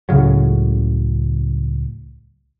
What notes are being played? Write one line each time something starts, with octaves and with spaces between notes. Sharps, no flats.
C#2 A2 C#3 F#3